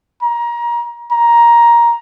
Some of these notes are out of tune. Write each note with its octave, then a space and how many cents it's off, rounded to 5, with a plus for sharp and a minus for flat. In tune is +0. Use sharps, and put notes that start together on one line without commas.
A#5 +25
A#5 +10